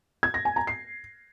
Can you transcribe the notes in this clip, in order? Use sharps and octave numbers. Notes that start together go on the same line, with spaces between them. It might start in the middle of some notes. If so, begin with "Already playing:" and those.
G#6
A#6
G#5
A#5
C7